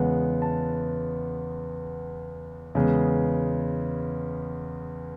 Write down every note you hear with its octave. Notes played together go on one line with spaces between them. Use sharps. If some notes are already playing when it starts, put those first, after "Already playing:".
Already playing: E2 C#3 G#3 B3 F#5
A5
E2 C#3 G#3 B3